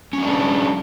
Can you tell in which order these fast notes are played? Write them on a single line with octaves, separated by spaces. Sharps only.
C#4 F#3 D4 G#4